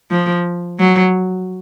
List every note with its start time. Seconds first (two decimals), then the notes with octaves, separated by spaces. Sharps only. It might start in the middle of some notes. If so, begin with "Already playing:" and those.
0.11 F3
0.79 F#3